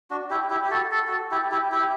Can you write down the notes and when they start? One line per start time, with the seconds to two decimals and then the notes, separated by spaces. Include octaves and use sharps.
0.10 D4 F#4
0.30 E4 G4
0.50 E4 G4
0.64 G4
0.71 F#4 A4
0.91 A4
1.07 F#4 A4
1.31 E4 G4
1.51 E4 G4
1.72 E4 G4